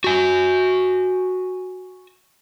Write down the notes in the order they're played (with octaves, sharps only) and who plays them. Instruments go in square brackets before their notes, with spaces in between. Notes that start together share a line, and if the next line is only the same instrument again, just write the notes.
[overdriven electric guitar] F#4 G#5